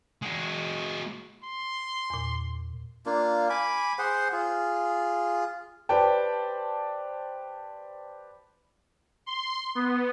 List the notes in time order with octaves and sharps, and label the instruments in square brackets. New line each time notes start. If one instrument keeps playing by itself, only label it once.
[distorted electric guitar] G#3 F#4
[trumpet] C6
[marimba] E2 A#2
[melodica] A#3 D4 F4
G#5 B5 D6
G#4 C5 F#5 C6
F4 G#4
[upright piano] G4 B4 C5 D5 G5 A5
[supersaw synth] C6
B3